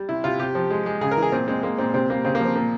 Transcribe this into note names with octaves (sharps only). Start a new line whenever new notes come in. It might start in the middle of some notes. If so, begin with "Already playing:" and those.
Already playing: G3
C3 E4
C3 F4
C3 G4
F3
G#3
G#3
C#3 G#4
A#4
E3
G#4
A#2 C4
G#3 C4
G#3 A#3
A#2 C4
C3 C4
G3 A#3
C#3 C4
A#3
F3
C4
A#2 A#3